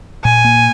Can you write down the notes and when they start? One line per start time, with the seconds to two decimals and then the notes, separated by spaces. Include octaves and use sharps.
0.24 A#2 G#5
0.45 A#3